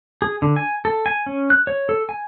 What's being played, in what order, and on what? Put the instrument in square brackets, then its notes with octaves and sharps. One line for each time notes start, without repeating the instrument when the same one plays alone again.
[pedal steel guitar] G#4
D3
G#5
A4
G#5
C#4
F#6
C#5
A4
G#5